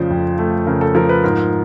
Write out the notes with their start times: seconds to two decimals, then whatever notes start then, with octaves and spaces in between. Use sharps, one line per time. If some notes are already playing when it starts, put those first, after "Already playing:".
Already playing: F2 C#3 F3 A3 C5 D5
0.10 F2
0.39 A3
0.67 C#3 A#4
0.81 A4
0.95 F3 A#4
1.09 B4
1.24 G#2 A#4